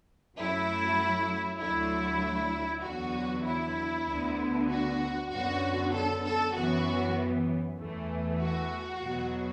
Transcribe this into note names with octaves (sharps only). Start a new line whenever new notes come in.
F#2 F#3 A3 E4
D2 D3 F#3 A3 E4
E2 D3 F#3 B3 F#4
E4
D2 D3 B3
F#4
F#2 D3 B3 F#4
A4
A4
F#2 E3 B3 F#4
E2 E3 A3
F#4
E2 B2 F#3 B3